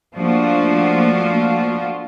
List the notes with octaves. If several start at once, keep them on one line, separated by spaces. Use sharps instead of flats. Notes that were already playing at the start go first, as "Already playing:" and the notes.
F3 A3 A#3 D4 F4 F#4